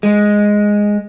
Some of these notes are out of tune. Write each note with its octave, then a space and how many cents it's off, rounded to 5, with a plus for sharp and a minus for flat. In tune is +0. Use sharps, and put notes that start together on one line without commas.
G#3 -5